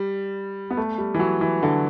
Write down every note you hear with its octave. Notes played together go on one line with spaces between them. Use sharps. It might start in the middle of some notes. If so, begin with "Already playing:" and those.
Already playing: G3
B3
A3
G3
E3
F#3
E3
D3